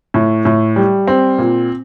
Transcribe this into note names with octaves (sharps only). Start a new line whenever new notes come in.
A2
A2
G3
C4
A#2